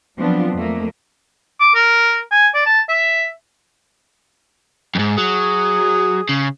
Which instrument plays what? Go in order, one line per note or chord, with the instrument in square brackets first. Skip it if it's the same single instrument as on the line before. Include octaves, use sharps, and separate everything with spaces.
[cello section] F3 F#3 B3 C4 D4 F4
F2 A3 A#3
[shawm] D6
A#4
G#5
D5
A5
E5
[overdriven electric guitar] F2 G#2
[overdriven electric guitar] F#3 [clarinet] G#4
[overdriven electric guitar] C#3